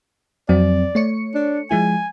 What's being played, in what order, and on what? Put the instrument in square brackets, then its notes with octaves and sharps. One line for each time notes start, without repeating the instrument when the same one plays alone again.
[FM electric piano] F2 F#3 C4 [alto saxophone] D5
[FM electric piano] A3 C#5 C#7
[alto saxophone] D4
[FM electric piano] F3 G#3 E4 [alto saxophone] G#5